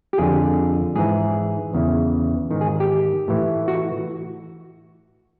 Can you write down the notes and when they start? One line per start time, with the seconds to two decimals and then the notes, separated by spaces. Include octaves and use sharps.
0.13 G4
0.18 F2 D3 G#4
0.95 G#2 E3 G#4
1.74 E2 C#3 E3
2.51 G#2 D#3
2.61 G#4
2.80 G4
3.28 A2 E3
3.68 F#4